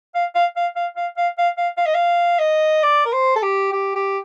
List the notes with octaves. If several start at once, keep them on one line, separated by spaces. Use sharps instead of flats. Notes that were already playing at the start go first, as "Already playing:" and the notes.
F5
F5
F5
F5
F5
F5
F5
F5
F5
D#5
F5
D#5
D5
A#4
C5
A4
G4
G4
G4